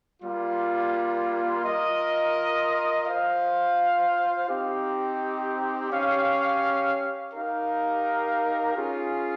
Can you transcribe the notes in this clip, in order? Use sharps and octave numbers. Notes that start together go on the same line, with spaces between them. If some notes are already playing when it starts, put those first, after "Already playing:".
G3 A#3 F4
F4 A#4 D#5
F4 C5 F5
C4 D#4 G4
C#4 G4 C#5 F5
D#4 G4 A#4 F5
C#4 F4 G#4